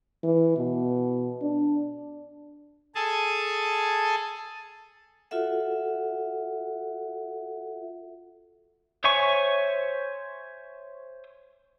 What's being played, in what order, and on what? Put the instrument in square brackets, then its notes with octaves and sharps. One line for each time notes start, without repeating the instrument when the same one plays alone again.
[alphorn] E3
B2
D4
[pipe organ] G#4 A4 G#5 A5
[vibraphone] F4 F#4 A4 E5 F#5
[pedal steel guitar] C5 C#5 E5 G#5 C#6